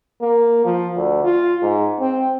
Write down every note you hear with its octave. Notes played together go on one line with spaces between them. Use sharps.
A#3
F3
D2
F4
G#2
C4